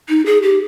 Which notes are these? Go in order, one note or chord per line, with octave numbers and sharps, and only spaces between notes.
D#4
G#4
G4